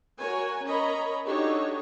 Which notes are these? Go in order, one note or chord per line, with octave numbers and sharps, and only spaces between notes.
F#4 A#4 C#5 G#5
C#4 A#4 C#5 D#5 A#5 B5
D4 D#4 F#4 G4 A4 C#5